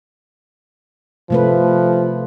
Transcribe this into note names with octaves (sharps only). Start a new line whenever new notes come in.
C3 F3 A3 B4